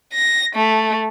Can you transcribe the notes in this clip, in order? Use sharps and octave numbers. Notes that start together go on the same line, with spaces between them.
A#6
A3